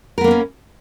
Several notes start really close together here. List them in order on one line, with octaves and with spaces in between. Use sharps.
A#4 B3 A#3 D4 C#4